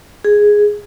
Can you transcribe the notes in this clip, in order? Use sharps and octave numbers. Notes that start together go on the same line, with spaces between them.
G#4